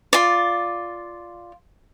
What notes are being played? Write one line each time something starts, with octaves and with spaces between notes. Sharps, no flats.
F4 D5